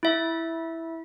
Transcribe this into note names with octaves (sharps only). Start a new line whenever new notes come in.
E4 E5